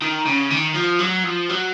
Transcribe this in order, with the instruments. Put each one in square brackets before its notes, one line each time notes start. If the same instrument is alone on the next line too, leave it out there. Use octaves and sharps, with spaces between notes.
[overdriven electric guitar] D#3
C#3
D#3
F3
F#3
F3
F#3